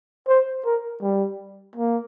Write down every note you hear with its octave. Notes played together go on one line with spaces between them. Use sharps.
C5
A#4
G3
A#3